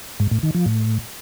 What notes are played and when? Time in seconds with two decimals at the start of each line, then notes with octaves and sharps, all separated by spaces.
0.20 G#2
0.31 A2
0.43 D#3
0.55 F3
0.66 A2